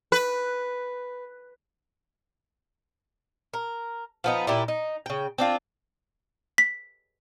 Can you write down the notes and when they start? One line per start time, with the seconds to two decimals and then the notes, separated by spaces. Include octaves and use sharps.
0.12 B4
3.53 A#4
4.24 F3 B3 D#4
4.47 A#2 E4 G4
4.68 D#4
5.06 C#3 G5
5.38 C4 D4 F4
6.58 B6